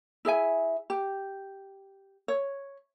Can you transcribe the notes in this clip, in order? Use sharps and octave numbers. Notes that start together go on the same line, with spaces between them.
E4 G#4 E5 G#5
G4
C#5